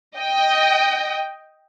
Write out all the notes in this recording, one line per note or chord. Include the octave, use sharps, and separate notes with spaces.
D#5 G5